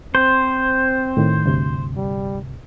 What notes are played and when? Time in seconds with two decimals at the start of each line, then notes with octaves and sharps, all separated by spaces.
0.15 C4 C5
1.17 A2 D#3
1.45 D2 G2 C3
1.96 G3